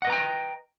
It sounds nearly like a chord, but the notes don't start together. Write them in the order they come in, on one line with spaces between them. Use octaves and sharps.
F#5 D#5 B4 A#5 G5